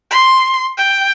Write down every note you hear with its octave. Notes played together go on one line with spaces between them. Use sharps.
C6
G5